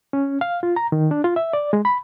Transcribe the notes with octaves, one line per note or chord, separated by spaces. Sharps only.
C#4
F5
F4
A#5
D#3
D4
F4
E5
D5
G#3
B5